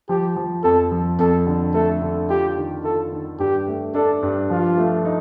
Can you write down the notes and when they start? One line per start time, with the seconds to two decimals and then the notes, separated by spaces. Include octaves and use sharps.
0.09 F3 G4
0.36 F3
0.64 F2 A4
0.91 F3
1.19 F2 A4
1.47 D3
1.74 A3 A4
2.02 D3
2.30 F4 G4
2.57 D#3
2.84 F4 A4
3.12 D#3
3.39 G2 G4
3.68 A3
3.94 D4 A4
4.23 G2
4.50 F3 F4
4.77 A3
5.05 D#4